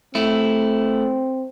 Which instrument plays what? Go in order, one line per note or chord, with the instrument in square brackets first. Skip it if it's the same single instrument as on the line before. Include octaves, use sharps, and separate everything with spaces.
[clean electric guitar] A3 E4 [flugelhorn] C4